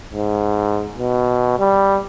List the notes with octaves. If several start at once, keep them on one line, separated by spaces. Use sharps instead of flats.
G#2
B2
G3